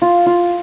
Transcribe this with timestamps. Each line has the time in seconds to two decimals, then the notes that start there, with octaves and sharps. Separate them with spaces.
0.02 F4
0.26 F4